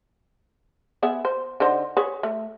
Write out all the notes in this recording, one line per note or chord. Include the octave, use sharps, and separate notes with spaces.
B3 G#4 E5
C5
D3 D#4 C5
G#4 B4 C#5
A3